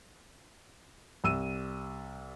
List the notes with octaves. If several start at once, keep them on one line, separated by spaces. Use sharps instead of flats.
C2 E6 D#7